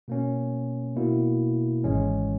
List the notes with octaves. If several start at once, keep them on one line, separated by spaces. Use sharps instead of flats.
B2 A#3 C#4
B2 A#3 E4
G#1 G#2 E3 G#3 C#4